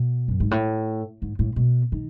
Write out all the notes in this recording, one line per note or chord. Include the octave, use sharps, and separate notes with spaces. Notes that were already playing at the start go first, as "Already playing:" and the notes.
Already playing: B2
F#2
G#2
A2
G#2
A2
B2
D#3